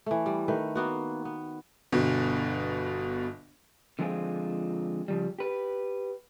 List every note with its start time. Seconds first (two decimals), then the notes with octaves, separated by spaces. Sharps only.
0.06 E3 A3
0.26 G3
0.48 D#3 A3 B4
0.75 A#3 B3 F#4
1.25 B3
1.92 G1 B2
3.99 D3 F3 G#3 C4 F4 G#4
5.08 C#3 F3 G3
5.39 G4 B4